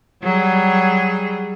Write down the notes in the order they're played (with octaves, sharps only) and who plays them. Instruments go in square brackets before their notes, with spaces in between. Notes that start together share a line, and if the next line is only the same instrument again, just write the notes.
[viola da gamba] F#3 G3 G#4